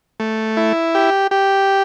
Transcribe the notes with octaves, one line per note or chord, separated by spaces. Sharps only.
A3
E4
G4
G4